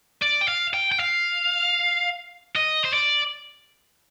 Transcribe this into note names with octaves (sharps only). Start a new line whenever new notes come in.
D5
G5
F5
G5
G5
F5
D#5
C5
D5